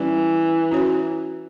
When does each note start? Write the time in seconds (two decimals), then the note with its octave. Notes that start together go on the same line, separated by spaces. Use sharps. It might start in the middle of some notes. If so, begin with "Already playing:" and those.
Already playing: E3 G3 C#4 G4 D5
0.71 C#4 F#4 C#5